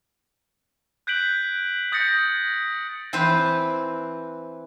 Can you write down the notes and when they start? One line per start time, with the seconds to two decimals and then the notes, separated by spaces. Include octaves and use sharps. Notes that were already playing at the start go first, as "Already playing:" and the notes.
1.07 F#6 G6 B6 D7 F#7
1.92 D#6 G6 A6 A#6 C#7
3.13 E3 C4 B4 C5